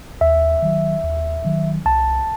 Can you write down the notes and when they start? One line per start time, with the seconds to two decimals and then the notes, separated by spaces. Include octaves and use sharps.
0.21 D#2 E5
0.63 D#3 F#3
1.03 D#2
1.45 D#3 F#3
1.86 C2 A5